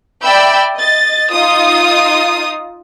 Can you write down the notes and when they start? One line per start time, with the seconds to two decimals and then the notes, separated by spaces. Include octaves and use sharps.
0.22 D5 E5 G5 B5 E6 G6
0.76 D#5 A6
1.30 D#4 F4 D#6